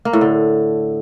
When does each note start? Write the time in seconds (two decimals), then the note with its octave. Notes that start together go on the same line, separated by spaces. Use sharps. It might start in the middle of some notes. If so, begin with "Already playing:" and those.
0.05 A#3
0.13 A2
0.21 D3